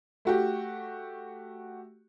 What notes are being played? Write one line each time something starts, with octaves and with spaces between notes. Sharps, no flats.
A3 F#4 G4